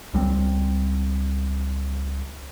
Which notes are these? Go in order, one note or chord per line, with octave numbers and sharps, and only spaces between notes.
C#2 G3 G#3 C4